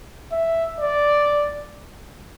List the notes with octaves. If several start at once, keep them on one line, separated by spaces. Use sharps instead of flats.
E5
D5